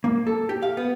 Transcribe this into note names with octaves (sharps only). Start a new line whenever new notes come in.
A#3
A4
G4
F5
B3